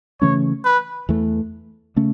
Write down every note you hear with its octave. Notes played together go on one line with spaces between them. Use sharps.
C#3 E3 A3 C#4 C#5
B4
E2 E3 A3
C#3 A3 C#4